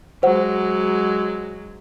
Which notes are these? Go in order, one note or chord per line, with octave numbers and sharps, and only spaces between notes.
F#3 G#3 C5 F#5